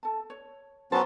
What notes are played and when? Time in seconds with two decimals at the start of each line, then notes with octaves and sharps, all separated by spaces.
0.03 A4 A5
0.30 C#5
0.92 F#3 B3 C#4 C5 G5 A5